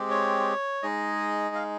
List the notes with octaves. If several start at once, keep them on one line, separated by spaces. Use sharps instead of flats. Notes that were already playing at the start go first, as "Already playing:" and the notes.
Already playing: G#3 C4 G4
C#5
G#3 D#4 G#4 D#5
F5